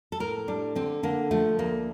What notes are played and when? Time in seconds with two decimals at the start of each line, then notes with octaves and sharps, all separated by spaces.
0.12 A4
0.20 A2 A#4
0.48 G3 D4
0.76 D3 C4
1.03 D3 A#3
1.31 F3 A3
1.59 D2 A#3